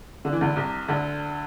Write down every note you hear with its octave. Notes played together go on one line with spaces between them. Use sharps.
D3
E3
D2 D3
C2 C3
D2 D3